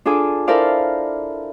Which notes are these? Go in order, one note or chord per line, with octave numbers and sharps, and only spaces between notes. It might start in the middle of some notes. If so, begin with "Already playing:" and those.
D4 F4 G#4 A4 G#5 D6
E4 A4 A#4 C5 D5 F5